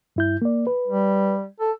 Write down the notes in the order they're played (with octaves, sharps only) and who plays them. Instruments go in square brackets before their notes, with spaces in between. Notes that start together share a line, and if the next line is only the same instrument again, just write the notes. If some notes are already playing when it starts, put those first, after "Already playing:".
[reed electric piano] G2 E4 G6
A#3 D5
B4
[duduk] G3
A4